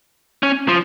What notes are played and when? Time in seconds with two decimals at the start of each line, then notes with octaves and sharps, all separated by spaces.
0.43 C#4
0.69 F3